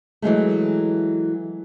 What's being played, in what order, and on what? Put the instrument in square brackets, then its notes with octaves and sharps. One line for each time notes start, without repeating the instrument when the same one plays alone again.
[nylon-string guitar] E3 F#3 G#3 A3